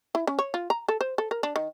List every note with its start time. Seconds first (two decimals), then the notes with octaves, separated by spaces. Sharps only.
0.15 E4
0.27 C#4
0.39 C#5
0.54 F4
0.70 A#5
0.89 A4
1.01 C5
1.18 A4
1.31 A#4
1.43 D4
1.56 D#3